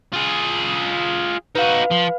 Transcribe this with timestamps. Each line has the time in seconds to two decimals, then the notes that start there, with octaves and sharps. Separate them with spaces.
0.13 F4 G#4
1.55 D#4 F#4 B4 F5
1.91 F3